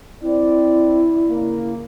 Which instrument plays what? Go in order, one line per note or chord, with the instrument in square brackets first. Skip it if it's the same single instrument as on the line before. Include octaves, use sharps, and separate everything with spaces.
[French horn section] C4 D5 [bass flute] E4
[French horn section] C#3 A#3